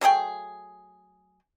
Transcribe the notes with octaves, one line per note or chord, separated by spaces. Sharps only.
F#3 A3 G#4 G5